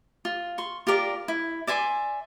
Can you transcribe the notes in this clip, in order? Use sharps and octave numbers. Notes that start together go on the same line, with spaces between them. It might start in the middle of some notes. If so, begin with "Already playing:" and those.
F4
C6 C#6
F4 G4 A#4 D5
E4
D5 E5 G#5 C6